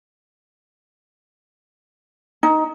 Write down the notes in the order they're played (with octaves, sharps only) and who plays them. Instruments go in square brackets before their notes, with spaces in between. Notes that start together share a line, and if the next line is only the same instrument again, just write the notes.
[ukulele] D#4